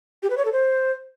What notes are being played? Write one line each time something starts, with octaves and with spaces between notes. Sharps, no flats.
G4
B4
C#5
A4
C5